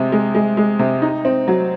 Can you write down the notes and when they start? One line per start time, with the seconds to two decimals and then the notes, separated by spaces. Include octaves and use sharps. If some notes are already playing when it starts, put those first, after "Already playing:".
Already playing: C3 G#3
0.12 G#3
0.35 G#3
0.57 G#3
0.79 C3
1.02 D#4
1.25 C4
1.48 F#3